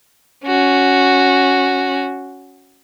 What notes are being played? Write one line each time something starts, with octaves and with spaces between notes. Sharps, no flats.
C#4 F#4